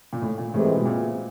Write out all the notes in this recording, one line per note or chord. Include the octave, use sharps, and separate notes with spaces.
A#2
A2
A#2
A2 C3 E3 G#3
B2
A#2